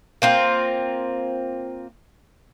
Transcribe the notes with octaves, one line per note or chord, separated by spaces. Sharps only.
A#3 C4 F4